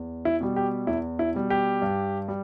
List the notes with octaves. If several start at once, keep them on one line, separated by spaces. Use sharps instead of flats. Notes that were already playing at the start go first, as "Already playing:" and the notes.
Already playing: E2
E4
B2 G3
G4
E2 E4
E4
B2 G3
G4
G2
G3